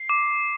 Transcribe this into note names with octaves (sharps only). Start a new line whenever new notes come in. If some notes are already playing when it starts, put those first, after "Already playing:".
Already playing: C7
D6